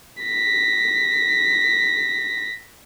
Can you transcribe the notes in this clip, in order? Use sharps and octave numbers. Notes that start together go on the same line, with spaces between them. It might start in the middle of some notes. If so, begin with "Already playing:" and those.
A#6 B6